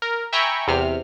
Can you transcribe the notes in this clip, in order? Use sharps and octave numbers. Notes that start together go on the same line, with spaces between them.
A#4
E5 G5 G#5 A#5 B5 C#6
E2 C3 F6